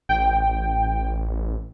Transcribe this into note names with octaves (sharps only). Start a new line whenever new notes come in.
A1 G5